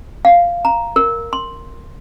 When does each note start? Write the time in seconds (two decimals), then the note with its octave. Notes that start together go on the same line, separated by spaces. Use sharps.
0.25 F5
0.65 A#5
0.96 A#4
1.33 C6